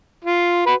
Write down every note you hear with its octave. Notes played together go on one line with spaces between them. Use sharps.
F4
F#4 B4